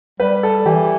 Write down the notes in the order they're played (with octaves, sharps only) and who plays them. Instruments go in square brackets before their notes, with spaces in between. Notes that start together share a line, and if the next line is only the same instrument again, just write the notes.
[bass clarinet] G3 [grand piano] B4
[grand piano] A4
[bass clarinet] E3 [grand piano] G4